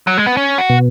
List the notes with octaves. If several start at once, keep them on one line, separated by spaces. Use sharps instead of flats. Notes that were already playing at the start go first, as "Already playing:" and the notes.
F#3
G#3
B3
C#4
F#4
B2